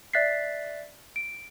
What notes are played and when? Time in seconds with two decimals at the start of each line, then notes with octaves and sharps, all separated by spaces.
0.13 D5 E5 F#6 A6 B6 C7
1.16 D7